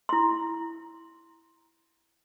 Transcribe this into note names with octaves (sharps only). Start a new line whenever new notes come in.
E4 C6